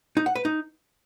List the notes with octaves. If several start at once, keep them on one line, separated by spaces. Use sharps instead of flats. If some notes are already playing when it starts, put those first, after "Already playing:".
D#4
F#5
B4
D#4